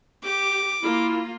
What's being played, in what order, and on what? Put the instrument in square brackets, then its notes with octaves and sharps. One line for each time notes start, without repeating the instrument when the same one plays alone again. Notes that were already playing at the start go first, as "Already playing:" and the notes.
[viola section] G4 [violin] D6
[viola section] A#3 F4 [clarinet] E4